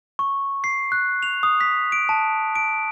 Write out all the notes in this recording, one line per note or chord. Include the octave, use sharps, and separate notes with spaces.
C#6
C7
F#6
F7
D#6
B6
D7
A5
D7